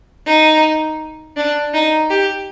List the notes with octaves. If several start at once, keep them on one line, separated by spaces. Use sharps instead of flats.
D#4
D4
D#4
G4